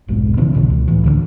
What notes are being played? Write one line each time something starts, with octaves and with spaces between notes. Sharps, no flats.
F1 B1 G#2
C#3 E3 B3
A#1 B2 D3
C#2
A2 E3
C#2 D3 A3 D4